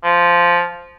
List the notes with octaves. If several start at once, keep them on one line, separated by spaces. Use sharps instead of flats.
F3